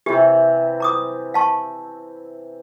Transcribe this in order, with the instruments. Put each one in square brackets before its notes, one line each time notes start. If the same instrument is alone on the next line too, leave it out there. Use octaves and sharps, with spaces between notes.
[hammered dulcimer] C3 E3 [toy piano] G4
[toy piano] A#5 D6 D#6
F5 A5 C#6